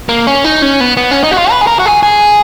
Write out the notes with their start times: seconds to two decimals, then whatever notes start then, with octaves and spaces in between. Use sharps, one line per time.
0.09 A#3
0.27 C#4
0.44 D#4
0.62 C#4
0.80 B3
0.97 B3
1.11 C#4
1.24 D#4
1.31 F#4
1.37 F4
1.51 B4
1.61 G#4
1.67 A#4
1.79 F#4
1.86 G#4
2.03 G#4